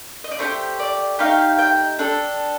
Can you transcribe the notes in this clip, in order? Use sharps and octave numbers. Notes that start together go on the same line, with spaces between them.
D#5
D5
A3 D#4 G4 C5
D5
A3 D#4 G4 F5
G5
D4 A4